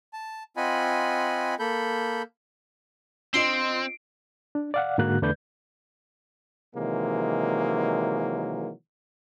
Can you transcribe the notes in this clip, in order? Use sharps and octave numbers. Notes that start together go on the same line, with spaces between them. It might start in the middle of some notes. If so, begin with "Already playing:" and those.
A5
C4 F4 D#5 F#5 G#5 B5
A#3 A4 B5 G6
C4 D4 F4 D#5 C6 C7 D7
D4
D5 F5 F#5
G#2 D3 A#3 F#4 F#6
E2 D3 A3 B4 D5 G6
C3 D#3 E3 F#3 G#3 A#3